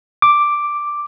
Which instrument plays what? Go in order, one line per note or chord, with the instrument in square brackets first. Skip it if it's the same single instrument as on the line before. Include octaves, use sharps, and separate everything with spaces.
[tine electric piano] D6